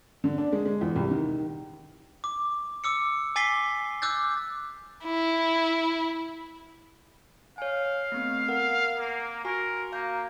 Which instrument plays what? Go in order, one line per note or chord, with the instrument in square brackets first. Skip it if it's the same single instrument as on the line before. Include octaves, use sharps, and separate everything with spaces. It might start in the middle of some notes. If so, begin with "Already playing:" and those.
[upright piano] D3
D4
G#3
G#3
E2
C2
D#3
[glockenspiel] D6
D6 E6 C#7
G#5 D6 A6 B6 C7 G7
D6 E6 F#6 G6 A6
[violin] E4
[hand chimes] C#5 G#5 [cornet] F5
[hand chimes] A3 B3 C4
A#4 F#5
[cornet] A#3
[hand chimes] F#4 G#5 C#6 [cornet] A#4
[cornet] A#3 [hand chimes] F5 A#5 G6